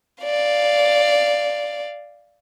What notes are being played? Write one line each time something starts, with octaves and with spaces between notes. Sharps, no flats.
D5 F5